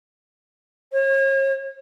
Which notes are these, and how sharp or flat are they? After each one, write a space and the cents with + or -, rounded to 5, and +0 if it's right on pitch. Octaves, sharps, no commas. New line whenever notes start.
C#5 -40